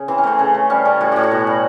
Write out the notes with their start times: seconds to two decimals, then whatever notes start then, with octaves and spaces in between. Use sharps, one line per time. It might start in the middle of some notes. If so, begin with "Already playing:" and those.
Already playing: C#3
0.08 E3 C4
0.18 C#4
0.24 A3 C4
0.39 C#3
0.54 A3
0.70 G3 C#4
0.85 G3
1.01 A2 F#4
1.12 A2 G4
1.23 F#4
1.32 B2
1.47 G3